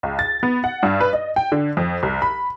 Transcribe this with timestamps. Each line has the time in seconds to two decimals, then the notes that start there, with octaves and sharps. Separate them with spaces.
0.03 C#2
0.19 A6
0.43 B3
0.64 F#5
0.83 G2
1.00 B4
1.13 D#5
1.36 G5
1.52 D3
1.77 F2
2.03 C2
2.22 B5